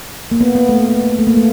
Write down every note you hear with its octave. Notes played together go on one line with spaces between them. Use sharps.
A#3
B3
B3
A3
A3
A#3
A3